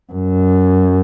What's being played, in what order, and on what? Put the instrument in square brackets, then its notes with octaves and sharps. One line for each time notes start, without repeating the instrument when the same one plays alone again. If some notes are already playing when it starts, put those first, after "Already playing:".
[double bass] F#2